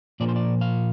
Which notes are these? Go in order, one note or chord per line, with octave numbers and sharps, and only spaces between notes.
A#2 F3 A#3 D5
C5
D5
F5